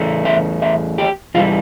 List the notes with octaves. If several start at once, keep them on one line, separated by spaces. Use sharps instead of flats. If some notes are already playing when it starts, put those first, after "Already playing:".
Already playing: E2 E3 A3
E5
E5
G4
E2 E3 G3 F4